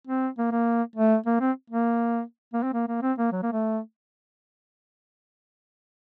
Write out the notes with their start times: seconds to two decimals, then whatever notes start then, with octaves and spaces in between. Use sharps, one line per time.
0.07 C4
0.38 A#3
0.51 A#3
0.96 A3
1.26 A#3
1.41 C4
1.70 A#3
2.54 A#3
2.63 C4
2.73 A#3
2.88 A#3
3.02 C4
3.18 A#3
3.32 F#3
3.42 A#3
3.52 A3